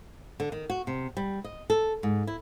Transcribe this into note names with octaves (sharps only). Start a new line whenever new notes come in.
D3
D#3
F#4
C3
G3
D#5
A4
G#2
E4